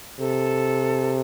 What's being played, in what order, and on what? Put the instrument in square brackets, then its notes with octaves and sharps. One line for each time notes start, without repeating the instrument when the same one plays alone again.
[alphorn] C3 [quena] A4